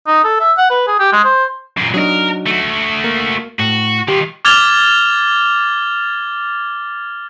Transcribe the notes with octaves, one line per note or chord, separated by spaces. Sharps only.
D#4
A4
E5
F#5
B4
G#4
G4
G#3
C5
F#2 A#2
F#3 D4 D#4 G#4 A#4
A3 F#4
A#3
A2 F#4
D#3 F4 G4
D6 F6 G#6 A6 F7 G7